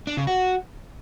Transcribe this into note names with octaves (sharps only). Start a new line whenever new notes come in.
D4
C#3
F#4